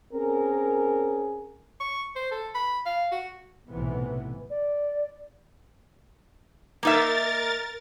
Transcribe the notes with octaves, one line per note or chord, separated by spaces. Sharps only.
C4 C#4 G#4 A#4
C#6
C5
A4
B5
F5
F#4
B1 A2 C3 E3 B3
D5
A#3 D#4 A#4 E5 A6